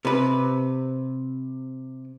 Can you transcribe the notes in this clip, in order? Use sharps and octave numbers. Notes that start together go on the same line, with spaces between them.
C3 B4